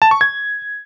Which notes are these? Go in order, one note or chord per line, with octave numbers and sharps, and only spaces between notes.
A5
C#6
G#6